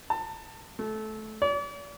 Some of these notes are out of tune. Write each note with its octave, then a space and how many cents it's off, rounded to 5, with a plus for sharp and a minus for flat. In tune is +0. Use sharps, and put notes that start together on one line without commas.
A5 +30
A3 -20
D5 -40